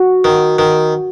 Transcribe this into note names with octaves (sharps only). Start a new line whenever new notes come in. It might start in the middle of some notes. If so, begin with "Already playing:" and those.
Already playing: F#4
D#3
D#3